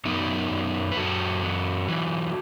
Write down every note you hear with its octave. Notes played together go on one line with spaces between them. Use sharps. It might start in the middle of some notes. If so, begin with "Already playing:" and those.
F#2 B3 D#4
F#2
B4
F#2 F#4 A4
F#3
E3